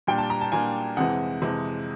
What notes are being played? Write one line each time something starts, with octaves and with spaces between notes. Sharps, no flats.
A#2 G3 A#3 D4 G5
A5
A#5
A5
A#2 G3 A#3 D4 G#5
F2 C3 E3 G#3 F#5
F2 C3 E3 G#3